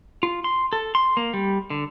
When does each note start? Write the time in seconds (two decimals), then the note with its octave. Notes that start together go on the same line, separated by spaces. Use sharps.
0.23 F4
0.44 C6
0.73 A4
0.95 C6
1.17 A#3
1.34 G3
1.70 D3